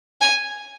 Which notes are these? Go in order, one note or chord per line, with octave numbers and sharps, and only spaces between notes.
G#5